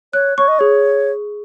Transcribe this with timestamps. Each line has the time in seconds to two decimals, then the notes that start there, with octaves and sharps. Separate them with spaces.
0.13 C#5 F#6
0.38 C#5 C#6
0.48 D#5
0.59 G#4 C#5